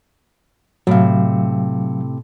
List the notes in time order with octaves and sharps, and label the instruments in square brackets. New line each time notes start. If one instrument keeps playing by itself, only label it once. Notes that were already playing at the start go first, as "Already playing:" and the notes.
[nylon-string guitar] A2 C3 [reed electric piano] F#3 F5